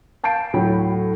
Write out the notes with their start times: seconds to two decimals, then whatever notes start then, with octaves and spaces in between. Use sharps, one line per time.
0.24 F5 A5 G6 C7 D7
0.53 D2 A2 F#3 G5 B5